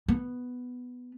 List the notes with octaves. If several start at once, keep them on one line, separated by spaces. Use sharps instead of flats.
B3